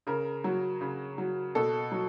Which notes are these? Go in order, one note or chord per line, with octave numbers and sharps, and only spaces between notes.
C#3 A#4
F#3
C#3
F#3
B2 A4
F#3